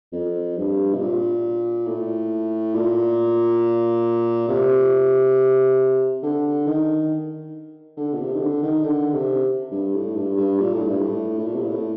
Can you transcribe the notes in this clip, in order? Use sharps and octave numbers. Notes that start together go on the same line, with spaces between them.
F2
G2
C3
A#2
A2
A#2
C3
D3
D#3
D3
A#2
C3
D#3
D3
D#3
D3
C3
G2
A2
G2
G2
A#2
A2
G2
A2
A2
A#2
C3
A#2
A2